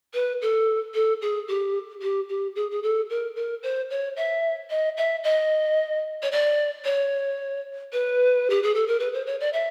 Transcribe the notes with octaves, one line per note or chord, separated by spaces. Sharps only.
B4
A4
A4
G#4
G4
G4
G4
G#4
G#4
A4
A#4
A#4
C5
C#5
E5
D#5
E5
D#5
C#5
D5
C#5
B4
G4
G#4
A4
A#4
B4
C5
C#5
D5
E5